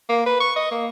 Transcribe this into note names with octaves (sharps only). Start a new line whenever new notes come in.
A#3
B4
C#6
D#5
A#3